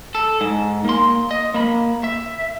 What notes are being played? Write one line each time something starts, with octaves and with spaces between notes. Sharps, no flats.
A4
G#2
A#3 C6
D#5
A#3 B5
E5